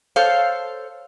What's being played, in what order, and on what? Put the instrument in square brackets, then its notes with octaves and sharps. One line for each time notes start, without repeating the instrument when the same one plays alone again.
[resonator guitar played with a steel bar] A4 C5 C#5 F5